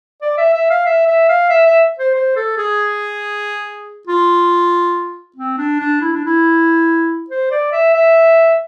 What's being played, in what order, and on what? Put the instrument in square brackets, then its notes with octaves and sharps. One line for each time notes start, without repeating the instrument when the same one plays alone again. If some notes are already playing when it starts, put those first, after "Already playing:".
[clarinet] D5
E5
E5
F5
E5
E5
F5
E5
E5
C5
C5
A4
G#4
F4
C4
D4
D4
E4
D4
E4
C5
D5
E5
E5